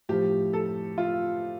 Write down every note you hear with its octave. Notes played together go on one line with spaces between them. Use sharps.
A2 F3 G4
A4
F4